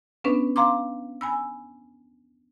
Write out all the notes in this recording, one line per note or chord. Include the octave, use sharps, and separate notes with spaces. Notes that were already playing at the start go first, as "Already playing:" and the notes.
B3 C#4 D4 B4
F5 A#5 C6 D6
G#5 B5 E6